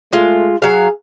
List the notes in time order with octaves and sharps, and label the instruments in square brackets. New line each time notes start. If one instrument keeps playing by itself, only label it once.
[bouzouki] G#3 F4 [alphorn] A3
[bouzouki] F#3 F5 [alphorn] G#4